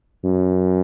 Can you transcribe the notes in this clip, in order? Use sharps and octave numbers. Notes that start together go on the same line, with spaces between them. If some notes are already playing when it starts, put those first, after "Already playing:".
F#2